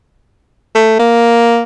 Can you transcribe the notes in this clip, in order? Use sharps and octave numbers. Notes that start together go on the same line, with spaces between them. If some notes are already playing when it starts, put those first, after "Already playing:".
A3
A#3